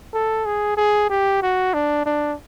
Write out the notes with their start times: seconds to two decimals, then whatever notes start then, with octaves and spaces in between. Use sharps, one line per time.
0.13 A4
0.45 G#4
0.77 G#4
1.10 G4
1.42 F#4
1.74 D4
2.06 D4